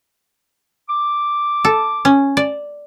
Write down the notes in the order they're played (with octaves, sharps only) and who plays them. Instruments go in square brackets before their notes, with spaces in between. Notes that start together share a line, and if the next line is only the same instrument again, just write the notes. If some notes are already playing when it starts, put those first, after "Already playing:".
[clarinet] D6
[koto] A4
C#4
D5